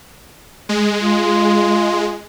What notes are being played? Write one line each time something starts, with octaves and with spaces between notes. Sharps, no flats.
G#3
F4